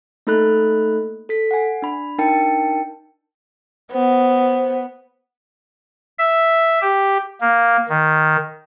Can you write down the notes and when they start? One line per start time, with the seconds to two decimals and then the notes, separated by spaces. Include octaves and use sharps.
0.27 A3 A#3 D#4 A4 B5 F#6
1.29 A4 B6
1.51 F#5 G#5
1.82 D4 B5
2.18 D4 D#4 A#4 G5 A5 C#7
3.93 B3 C5
6.18 E5
6.81 G4
7.41 A#3
7.89 D#3